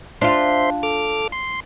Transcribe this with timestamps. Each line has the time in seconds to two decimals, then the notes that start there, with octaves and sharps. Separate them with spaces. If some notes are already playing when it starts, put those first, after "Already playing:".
0.21 D4 F4 C5 E5 C6
0.83 A4 D6 F6
1.32 C6